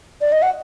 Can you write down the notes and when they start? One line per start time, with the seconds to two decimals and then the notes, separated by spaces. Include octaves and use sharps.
0.21 D5
0.32 D#5
0.42 F#5